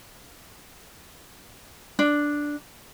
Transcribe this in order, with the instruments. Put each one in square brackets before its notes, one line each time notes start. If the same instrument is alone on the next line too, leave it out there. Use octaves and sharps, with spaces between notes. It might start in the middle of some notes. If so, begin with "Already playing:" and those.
[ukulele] D4